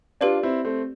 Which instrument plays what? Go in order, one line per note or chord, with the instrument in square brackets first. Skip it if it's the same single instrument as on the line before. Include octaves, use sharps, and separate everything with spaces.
[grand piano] D4 F4 [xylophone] G4 B4 D5
[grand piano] C4 E4
A3 C4